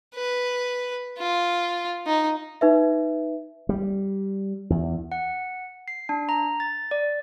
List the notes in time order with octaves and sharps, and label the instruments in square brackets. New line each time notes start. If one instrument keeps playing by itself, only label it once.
[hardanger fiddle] B4
F4
D#4
[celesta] D#4 B4 E5
[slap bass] G3
E2
[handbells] F#5
C7
D4
A#5
A6
D5